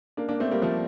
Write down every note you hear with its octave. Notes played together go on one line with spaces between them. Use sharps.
A#3 D4
A#3 D4
A3 C4
G3 A#3
F3 A3